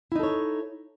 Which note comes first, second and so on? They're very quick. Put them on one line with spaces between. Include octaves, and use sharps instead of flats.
E4 D#4 A4 C#5